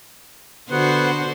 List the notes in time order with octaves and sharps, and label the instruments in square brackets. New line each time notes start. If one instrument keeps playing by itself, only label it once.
[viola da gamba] D3 F#4 C5 [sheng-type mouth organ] B3 F#5